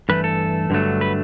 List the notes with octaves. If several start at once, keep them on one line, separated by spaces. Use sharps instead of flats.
G2 E3 A3 B4
A4
G2 D3 F#3 A3
B4